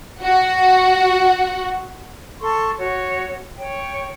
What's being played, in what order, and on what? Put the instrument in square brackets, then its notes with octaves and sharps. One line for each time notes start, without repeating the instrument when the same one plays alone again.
[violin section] F#4 F#5
[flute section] A4 C6 C#6
F#4 C#5
C#5 G5